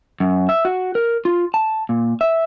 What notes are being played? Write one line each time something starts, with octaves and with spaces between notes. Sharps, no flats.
F#2
E5
F#4
A#4
F4
A5
A#2
E5